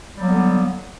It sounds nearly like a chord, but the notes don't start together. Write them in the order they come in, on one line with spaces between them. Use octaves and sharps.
G3 F#3 A#3 B3 D3